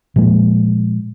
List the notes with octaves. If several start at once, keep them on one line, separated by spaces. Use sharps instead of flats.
A#2 F3 G#3